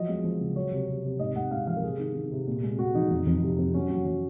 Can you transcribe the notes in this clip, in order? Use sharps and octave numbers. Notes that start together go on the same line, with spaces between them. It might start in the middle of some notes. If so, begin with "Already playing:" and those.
Already playing: F3 F#3 D#5
G#3
F3
C#3
F#3 C#5
C3
C3
C3
G#2 D#5
G#2 F#5
G#2 F5
F3 F5
A#4
C3 G#4
D#3
D#3
C3
A#2
G#3
G#3 F#4
F3 D#4
F2
F2
C3
F2
F#3 C#4
F#3
F#3